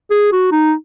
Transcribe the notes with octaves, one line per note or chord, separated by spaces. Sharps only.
G#4
F#4
D#4